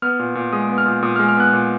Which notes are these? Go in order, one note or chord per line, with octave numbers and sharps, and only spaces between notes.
B3 F6
A#2
A#2
G#3 D#6
B3
F6
A#2
A#2 D#6
G#3 F6
F6
B3 F#6
A#2